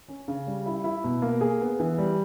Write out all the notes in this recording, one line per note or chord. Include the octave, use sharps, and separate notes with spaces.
C#4
C#3
G3
E4
E4
B2
A#3
G#4
B3
E3
G3